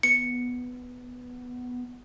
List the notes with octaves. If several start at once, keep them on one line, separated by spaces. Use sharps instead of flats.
B3 C#7